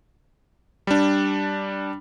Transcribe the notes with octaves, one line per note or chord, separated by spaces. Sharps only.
G3 D4